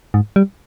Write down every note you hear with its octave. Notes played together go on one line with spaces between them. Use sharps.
G#2
G3